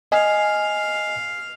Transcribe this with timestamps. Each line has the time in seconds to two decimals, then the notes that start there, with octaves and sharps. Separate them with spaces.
0.12 D#5 F5 G#5